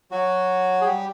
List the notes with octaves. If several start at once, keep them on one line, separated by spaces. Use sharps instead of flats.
F#3 F#4
G#4
G3 G4